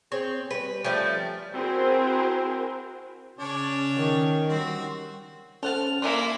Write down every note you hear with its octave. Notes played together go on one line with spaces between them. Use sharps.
C4 G#4 C#5
G3 B4
F3 G#3 A3 C#4 D5 G5
C4 E4 F#4 G#4 A#4 C5
C#3 C#4 D4 C#5 D5
D#3
G3 C4 F#4
C#4 A4 C5 F#5 A5 F6
A#3 D4 E4 A#4 E5 G#5 A#5 C6